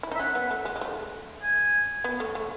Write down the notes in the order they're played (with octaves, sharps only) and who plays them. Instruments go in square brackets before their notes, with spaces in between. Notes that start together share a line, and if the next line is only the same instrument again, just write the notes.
[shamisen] E4
D#4
[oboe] E5
[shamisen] C#4 [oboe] F#5
[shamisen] B3
A3
G#3
G#3
A3
[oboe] G#5
[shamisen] B3
A3
A3